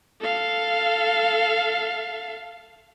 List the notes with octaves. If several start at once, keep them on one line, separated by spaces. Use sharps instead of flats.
A4 F5